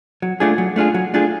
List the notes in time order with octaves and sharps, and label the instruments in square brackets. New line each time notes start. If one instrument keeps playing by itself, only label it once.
[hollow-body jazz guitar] F#3
A3 D4 F4 G#4
F#3
A3 D4 F4 G#4
F#3
A3 D4 F4 G#4